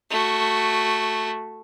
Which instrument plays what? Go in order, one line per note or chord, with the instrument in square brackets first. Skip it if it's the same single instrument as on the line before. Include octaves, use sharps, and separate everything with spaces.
[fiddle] A3 F#4